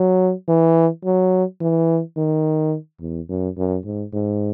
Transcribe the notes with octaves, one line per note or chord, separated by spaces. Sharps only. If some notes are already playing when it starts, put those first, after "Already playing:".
Already playing: F#3
E3
F#3
E3
D#3
E2
F#2
F#2
G#2
G#2